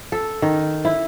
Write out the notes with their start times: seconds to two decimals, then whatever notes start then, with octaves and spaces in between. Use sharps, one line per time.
0.12 A4
0.42 D#3
0.85 E4